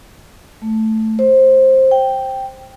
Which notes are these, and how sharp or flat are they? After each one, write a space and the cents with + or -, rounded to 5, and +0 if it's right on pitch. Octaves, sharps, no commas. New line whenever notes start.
A3 +0
C5 +15
G5 -5